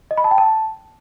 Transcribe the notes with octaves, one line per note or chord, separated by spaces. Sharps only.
D#5
B5
A5
G5
A5